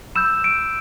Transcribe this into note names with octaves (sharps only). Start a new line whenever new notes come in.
B5 E6 G6 E7
D7